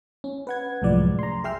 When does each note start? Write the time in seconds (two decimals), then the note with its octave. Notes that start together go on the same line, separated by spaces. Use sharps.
0.24 C#4
0.47 B4 F#5 G#6
0.82 C2 F#2 A2 F3 G#3 D5
1.19 A#5 C6
1.44 G#4 E5 G5 C6 E6 F6